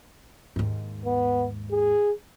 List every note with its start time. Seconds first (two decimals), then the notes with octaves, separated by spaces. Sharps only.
0.56 D#2 G#2
1.06 B3
1.71 G#4